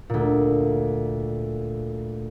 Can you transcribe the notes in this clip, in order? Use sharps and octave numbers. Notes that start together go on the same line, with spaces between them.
D2 A#2